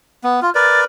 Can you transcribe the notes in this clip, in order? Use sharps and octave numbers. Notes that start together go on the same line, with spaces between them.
B3
F4 F6
A#4 B4 D5 A6